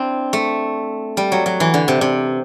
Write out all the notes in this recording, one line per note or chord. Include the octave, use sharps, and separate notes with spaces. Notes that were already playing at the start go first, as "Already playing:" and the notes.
Already playing: C4 D4 E4
A3
G3
F#3
F#3
E3
D3
C3
C3